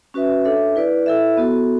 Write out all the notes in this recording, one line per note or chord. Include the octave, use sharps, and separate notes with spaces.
C#4 F#4 B4 E5
D4 A4 C#5 E5
E4 B4 D5
E4 A4 E5
B3 F#4 A4